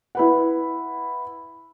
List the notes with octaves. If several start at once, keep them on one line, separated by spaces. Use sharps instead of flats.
E4 B4 F#5